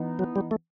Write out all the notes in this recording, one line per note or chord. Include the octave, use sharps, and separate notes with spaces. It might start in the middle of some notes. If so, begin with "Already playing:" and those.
Already playing: E3 B3 D#4
F#3
G3
A3